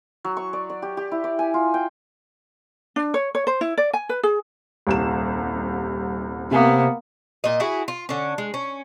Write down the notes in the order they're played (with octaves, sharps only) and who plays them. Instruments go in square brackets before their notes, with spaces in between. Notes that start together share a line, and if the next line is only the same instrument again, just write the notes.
[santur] F#3
C#6
D5
D5
G4
G4
E4
D5
G#5
F4
G5
[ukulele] D4
C#5
C#5
C5
E4
D5
G#5
B4
G#4
[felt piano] D#1 C2 E7
[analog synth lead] C3 [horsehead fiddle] A#3 B3
[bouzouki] A#2 D#5
E4 F#4 G#4
F4
D3 C#4
G#3
C#4